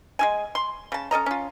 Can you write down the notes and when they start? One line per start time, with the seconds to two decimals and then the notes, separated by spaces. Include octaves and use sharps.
0.19 G#3 E4 G#5
0.55 C6
0.92 C#3 A5
1.11 C#4 A4 D#5 A#5
1.26 C#4 F4